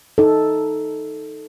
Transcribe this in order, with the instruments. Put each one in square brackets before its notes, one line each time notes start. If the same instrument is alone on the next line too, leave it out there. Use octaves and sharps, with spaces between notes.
[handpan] D#4 A4